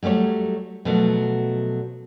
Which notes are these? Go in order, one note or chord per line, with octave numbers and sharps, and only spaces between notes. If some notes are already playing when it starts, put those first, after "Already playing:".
F#3 G3 A3 G4 C#5
B2 F3 F#3 A3